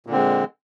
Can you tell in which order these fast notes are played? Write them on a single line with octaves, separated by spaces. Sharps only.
A#2 D3 C4 G#3